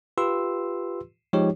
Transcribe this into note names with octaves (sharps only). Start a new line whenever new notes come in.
F4 G4 B4 C6 E6
F3 G#3 D#4 G4 C#5